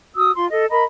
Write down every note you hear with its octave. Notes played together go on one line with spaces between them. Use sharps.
F#4 D#6 E6
F4 C6
A4 D#5
A#4 D#5 A#5 B5